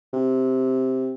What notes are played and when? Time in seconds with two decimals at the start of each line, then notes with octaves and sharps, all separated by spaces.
0.13 C3